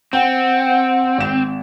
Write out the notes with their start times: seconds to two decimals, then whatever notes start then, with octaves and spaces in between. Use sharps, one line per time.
0.13 C4 F#5 G5
1.18 G#1 E7